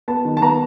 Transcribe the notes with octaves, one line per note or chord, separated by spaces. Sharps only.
B3 A5
D#3
A5
B3 A#5